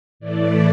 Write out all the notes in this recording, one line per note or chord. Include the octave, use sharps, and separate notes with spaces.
A2 E3 A3 D5